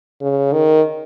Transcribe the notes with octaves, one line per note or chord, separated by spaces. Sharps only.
C#3
D#3